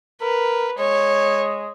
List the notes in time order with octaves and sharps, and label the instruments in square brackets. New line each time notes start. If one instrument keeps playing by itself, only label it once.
[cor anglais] A#4 [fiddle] B4
[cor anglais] G#3 [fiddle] C#5